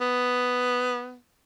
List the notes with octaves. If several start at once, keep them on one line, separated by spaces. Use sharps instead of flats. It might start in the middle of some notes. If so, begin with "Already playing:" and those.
B3